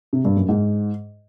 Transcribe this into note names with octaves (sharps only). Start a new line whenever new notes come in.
C3
G2
F#2
G#2